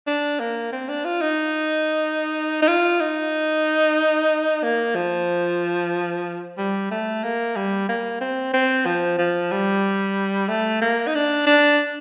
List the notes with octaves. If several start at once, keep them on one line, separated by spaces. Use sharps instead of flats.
D4
A#3
C4
D4
F4
D#4
D#4
F4
D#4
A#3
F3
G3
A3
A#3
G3
A#3
C4
C4
F3
F3
G3
A3
A#3
D#4
D4
D4